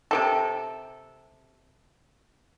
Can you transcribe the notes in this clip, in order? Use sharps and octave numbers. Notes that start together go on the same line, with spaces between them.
C3 F3 A4